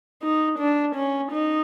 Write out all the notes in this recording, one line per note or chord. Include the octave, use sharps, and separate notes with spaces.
D#4
D4
C#4
D#4